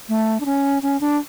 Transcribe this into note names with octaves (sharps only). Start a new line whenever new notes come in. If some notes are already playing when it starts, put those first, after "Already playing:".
A3
D4
C#4
C#4
D4